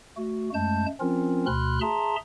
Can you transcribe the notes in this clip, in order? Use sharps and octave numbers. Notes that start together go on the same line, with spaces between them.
A3 F#4
F#2 G#3 A3 A5 G6
F3 C4 C#4 F4 A#4
D2 B2 B5 C6 F6 F#6
G#4 E5 A5 A#5 C6